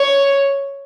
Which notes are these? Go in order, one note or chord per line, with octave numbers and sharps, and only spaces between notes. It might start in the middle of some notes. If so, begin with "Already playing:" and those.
Already playing: C#5